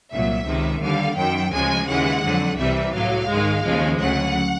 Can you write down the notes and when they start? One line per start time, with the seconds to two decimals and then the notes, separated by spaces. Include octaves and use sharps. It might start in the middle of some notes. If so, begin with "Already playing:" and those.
0.11 C2 A#2 F#3 E5
0.46 C#2 C3 D#3
0.82 D#2 D3 G3 F5
1.17 F#2 D#3 F#3 G5
1.52 D2 C#3 F3 G#3 G#5
1.87 D#2 C#3 E3 G#3 F#5
2.23 F2 D3 F#3
2.58 C2 C3 E3 G3 E5
2.93 A2 F#3 F5
3.29 G#2 D#3 G#3
3.64 D#2 C#3 F3 G#3
3.99 D2 C#3 F#3 F#5